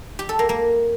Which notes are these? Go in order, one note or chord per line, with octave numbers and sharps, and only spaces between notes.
G4
A4
A#3
A#3